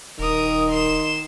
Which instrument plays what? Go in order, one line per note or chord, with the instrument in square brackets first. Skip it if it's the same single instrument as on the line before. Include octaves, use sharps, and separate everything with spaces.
[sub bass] D#1 [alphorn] D#3 [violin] A#4 D#6
[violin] C6 E7